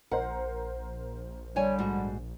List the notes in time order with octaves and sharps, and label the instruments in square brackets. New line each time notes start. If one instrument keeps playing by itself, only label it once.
[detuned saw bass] A#1 [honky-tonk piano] A#4 C5 [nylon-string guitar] F#5
[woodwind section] D3 G3 [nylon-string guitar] C#5 G#5
[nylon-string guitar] G#2 F#4